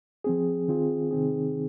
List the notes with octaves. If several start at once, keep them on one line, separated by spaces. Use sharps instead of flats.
F3 C4 G#4
D#3 C4 F4 G#4
C3 D#3 C4 D#4 G#4